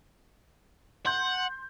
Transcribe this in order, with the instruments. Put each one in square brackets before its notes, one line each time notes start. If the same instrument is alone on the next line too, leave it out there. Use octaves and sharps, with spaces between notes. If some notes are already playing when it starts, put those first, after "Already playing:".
[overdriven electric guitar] F#5 [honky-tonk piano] C6 G6